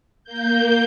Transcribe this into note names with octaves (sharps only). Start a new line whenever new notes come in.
A#3 G6